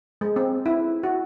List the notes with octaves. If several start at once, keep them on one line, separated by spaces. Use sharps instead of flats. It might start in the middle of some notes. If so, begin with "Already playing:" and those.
G#3
C4
E4
F#4